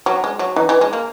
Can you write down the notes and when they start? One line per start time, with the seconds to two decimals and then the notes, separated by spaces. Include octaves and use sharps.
0.06 F#3 F#4
0.24 G#3
0.39 F#3
0.56 E3 D#4
0.69 E3
0.81 G#3
0.93 A#3